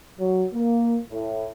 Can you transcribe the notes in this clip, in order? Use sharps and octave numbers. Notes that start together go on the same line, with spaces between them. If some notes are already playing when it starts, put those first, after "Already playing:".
F#3
A#3
A2